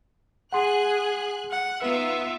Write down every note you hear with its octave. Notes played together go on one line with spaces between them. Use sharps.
G#4 F#5 G#5 C6 F#6
F#5
B3 D#4 F4 B4 E5